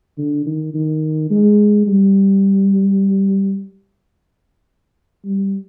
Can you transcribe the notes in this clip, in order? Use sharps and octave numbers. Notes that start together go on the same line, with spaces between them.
D3
D#3
D#3
G#3
G3
G3